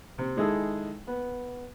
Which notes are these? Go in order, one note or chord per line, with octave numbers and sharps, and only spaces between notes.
C3
D#3 G#3 E4 G#4 A4
B3